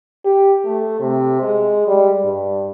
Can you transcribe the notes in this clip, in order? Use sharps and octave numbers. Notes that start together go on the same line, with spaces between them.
G4
A3
C3
G#3
G3
G2